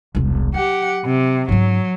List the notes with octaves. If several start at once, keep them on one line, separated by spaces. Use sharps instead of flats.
E1 C2
F#3 G4 F#5
C3
G#2 F#3 C#4